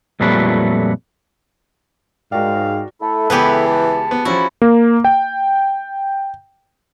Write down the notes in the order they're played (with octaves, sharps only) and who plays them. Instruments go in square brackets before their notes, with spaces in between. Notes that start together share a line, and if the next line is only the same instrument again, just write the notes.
[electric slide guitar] F2 A#2 F#3 G3 A3 B4
[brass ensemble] G#2 [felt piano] F#4 A#4 D5 [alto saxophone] F5 [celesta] G5
[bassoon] A3 [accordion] E4 A4
[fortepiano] C#2 B3 [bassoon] E3 [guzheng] G4 G#4 B4
[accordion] A5
[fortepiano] B3
[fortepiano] F3 C#4 F#4 [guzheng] E4
[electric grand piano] A#3
G5